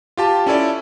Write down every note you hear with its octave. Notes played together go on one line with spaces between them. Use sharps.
F4 G4 A5
C#4 E4 A4 D5